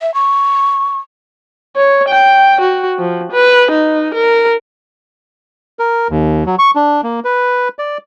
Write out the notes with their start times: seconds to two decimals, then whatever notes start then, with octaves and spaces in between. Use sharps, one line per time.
0.01 E5
0.14 C#6
1.77 C#5
2.09 G5
2.61 F#4
2.99 F3
3.32 B4
3.71 D#4
4.14 A#4
5.79 A#4
6.10 D#2
6.46 F#3
6.59 C#6
6.75 D4
7.04 A#3
7.24 B4
7.79 D5